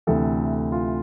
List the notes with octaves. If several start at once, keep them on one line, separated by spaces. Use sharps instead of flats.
D2 C3 E3 A4
F4